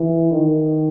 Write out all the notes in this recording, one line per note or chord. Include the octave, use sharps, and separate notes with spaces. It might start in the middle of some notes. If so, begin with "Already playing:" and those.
Already playing: E3
D#3